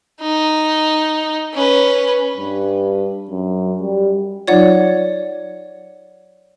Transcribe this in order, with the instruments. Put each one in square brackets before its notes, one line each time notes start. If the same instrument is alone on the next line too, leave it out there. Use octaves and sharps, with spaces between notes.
[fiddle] D#4
C#4 B4
[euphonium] G2
F#2
G3
[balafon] F#3 D#4 F4 [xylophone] C#5 D5 F#5